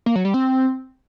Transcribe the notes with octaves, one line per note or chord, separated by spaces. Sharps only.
A#3
F#3
G3
C4